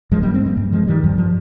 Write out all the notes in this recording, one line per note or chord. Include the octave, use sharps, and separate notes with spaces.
G2 F3 G#3
G3 A#3
G#3 C4
G3 A#3
G2
F3 G#3
D#3 G3
G2 F3
F3